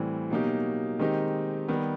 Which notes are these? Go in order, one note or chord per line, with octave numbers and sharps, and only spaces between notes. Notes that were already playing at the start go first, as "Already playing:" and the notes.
Already playing: A2 E3 G3 C4
B2 F#3 A#3 D#4 G4
D#3 G#3 C4 D#4 G4
D#3 G3 B3